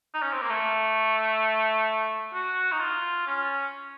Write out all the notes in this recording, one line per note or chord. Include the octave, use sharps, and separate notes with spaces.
D#4
C#4
C4
A#3
A3
F#4
D#4
F4
C#4